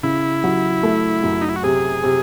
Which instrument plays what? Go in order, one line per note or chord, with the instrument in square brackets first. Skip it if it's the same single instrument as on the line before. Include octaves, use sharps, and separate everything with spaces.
[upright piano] C#3 [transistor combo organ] E4
[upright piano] F#3
A3
F#2
[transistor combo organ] D#4
E4
F#4
[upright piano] C3 [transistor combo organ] G#4
[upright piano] C3